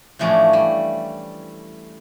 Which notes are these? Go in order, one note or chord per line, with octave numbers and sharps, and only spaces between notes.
A2 E3 F3 A3 C#4 D4
G3